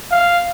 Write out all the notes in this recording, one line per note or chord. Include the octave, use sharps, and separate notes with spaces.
F5